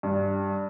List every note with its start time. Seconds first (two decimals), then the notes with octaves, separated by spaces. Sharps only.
0.03 G2